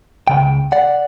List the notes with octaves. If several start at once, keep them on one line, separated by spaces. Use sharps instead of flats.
C#2 C#3 G5
D5 F#5